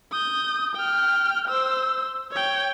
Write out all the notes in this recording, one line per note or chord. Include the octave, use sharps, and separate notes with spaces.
D#6 G6
G5 F6
C5 E6
C#5 G5